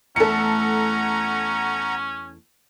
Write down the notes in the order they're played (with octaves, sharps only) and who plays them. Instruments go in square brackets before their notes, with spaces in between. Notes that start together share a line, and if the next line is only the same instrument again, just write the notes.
[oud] E2 A3 [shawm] C#4 [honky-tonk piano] A4 C#7 [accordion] F#5 A#5